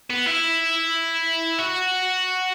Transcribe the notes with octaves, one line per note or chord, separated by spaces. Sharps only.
B3
E4
F#4